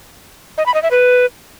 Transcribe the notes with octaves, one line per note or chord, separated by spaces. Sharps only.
D#5
B5
D#5
E5
B4